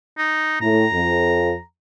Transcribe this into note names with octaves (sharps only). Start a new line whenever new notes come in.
D#4
A2 A#5
F2